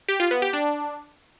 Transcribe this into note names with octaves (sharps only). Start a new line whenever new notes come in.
G4
F4
B3
G4
D4